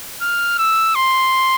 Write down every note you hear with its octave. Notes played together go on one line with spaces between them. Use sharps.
F6
E6
C6